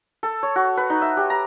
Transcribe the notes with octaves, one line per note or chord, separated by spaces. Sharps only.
A4
C#5
F#4
B4
D#4
E5
G4
A#5